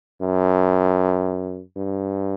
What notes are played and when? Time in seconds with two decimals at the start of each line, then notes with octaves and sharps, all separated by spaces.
0.21 F#2
1.76 G2